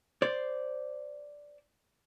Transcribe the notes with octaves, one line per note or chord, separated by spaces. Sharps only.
C5 D5